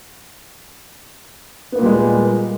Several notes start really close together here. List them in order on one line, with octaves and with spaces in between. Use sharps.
B3 A#3 A#2 G3 G#3